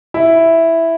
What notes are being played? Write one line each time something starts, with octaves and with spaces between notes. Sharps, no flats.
E4